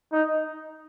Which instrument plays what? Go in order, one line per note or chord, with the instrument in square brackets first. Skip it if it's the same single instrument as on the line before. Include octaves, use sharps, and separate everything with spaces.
[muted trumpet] D#4